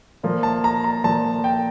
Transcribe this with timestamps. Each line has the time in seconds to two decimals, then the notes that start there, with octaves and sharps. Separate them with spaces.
0.23 A#2 F3 A#3
0.43 A5
0.64 A#5
0.84 A#5
1.04 A#2 F3 A#3 A5
1.44 G5